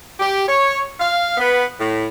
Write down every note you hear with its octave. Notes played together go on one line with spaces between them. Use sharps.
G4
C#5
F5
B3
A2